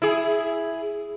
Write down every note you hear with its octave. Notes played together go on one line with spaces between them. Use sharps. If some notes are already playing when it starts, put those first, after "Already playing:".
E4 G#4